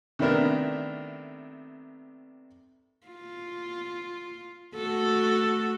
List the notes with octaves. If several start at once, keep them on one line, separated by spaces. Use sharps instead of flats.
C3 D#3 A3 B3 D4 A#4
F4
A3 F#4 A4